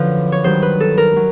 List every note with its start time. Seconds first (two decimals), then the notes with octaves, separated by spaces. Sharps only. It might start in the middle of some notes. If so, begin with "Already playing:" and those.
Already playing: F#2 D3 F3 B4
0.32 C#5
0.44 G2 D#3 F#3 C5
0.62 B4
0.80 A4
0.98 A#4
1.16 F#3